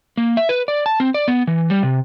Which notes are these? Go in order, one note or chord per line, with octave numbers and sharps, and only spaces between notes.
A#3
E5
B4
D5
A5
C4
D5
B3
E3
G3
C3